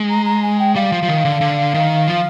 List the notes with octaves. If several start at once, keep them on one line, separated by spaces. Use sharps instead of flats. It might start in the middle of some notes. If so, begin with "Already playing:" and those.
Already playing: G#3
A#5
A#5
G#5
G5
G3 F5
F3
F3
D#3
D3
D3
D#3
F3